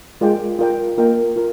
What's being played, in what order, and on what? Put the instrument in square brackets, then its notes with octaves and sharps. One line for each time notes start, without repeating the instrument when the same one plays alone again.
[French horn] G#3 [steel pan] F4 A#4 D5 G5
[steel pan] F4 A#4 D5 G5
[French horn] A#3 [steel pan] F4 A#4 D#5 G5
[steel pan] F4 A#4